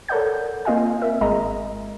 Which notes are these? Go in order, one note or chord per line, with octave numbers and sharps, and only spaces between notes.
A4 A#4 C#5 D5 F#5 G6
A#3 C4 F4 D#5 F5 G#5
A#4 E5
G#1 G#3 D#5 A#5